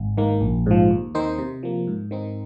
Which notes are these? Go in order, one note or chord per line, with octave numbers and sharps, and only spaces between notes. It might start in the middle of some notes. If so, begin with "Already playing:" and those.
Already playing: G#1
G#2 D#3 A#3
A#1
G#2 F3
D#2
D#3 C4 D#4 C5
C3
F3 A#3
G#2
D#3 C4 D#4